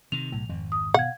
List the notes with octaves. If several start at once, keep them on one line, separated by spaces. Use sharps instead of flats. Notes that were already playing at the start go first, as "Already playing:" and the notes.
C3 D#3 F7
B1 A2
G#1 F2
D#6
B2 F5 F#5 G#6